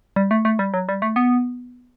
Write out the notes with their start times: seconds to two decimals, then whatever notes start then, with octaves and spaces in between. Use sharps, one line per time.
0.16 G3
0.31 A3
0.45 A3
0.59 G3
0.74 F#3
0.89 G3
1.02 A3
1.16 B3